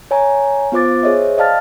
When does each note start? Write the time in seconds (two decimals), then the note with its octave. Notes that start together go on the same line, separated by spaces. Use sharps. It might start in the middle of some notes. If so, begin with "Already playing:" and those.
0.11 C#5 G#5 A#5
0.72 B3 F4 C5 D6 A6
1.03 G#4 C5 C#5 D#5 E5
1.38 D5 D#5 F5 A5 F6 A6